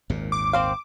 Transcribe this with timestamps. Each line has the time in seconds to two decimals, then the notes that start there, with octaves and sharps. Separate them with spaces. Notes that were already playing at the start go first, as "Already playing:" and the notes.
0.10 G#1 D#2 A#2
0.32 D6
0.53 C4 C5 F5